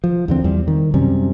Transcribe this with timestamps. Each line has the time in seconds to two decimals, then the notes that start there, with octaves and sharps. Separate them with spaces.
0.04 F3
0.28 E2 D3 C4
0.44 E2 G3
0.68 D#3
0.94 F#2 C3 G3 C#4